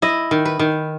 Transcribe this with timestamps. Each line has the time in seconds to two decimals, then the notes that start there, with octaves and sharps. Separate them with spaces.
0.02 E4 D#5
0.31 D#3
0.45 B4
0.59 D#3